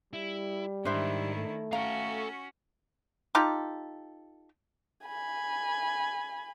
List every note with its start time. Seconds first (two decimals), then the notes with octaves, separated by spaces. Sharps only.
0.13 G3 E4
0.85 G#2 D#3 D4 E4 C5 E5
1.36 A3
1.73 C#4 F#4 A4 F5 A#5
3.35 D#4 F4 G4 A4
5.07 G#5 B5